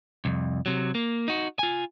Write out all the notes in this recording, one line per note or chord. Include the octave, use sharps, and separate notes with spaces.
C2 F2
C3 F#3
A#3
D#4 F#4
F4 G#5